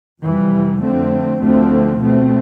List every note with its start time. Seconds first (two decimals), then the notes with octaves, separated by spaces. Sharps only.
0.22 F2 C3 E3 G3
0.82 F2 D3 A3 C4
1.42 D2 D3 F3 A3 C4
2.00 B2 A3 C4